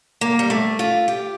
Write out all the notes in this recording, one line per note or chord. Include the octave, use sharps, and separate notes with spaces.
A#3
G3
A3
F4
G4